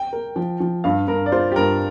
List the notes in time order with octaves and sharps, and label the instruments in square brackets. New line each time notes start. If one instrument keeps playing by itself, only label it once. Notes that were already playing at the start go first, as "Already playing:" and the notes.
Already playing: [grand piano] G5
[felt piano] A#4
F3
F3
[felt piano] G2 [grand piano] F5
[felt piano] G2 [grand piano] A#4
[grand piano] D5
[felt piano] F4 [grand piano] C5
[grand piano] G4
[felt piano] G2 [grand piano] A#4